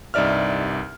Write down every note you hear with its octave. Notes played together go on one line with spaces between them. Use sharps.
C2 G2 D#4 D5 E5 F6